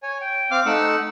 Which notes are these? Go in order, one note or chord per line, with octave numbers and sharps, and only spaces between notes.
C#5 G#5
G5
C4 F5 D6 F6
A3 D#4 F#5 E6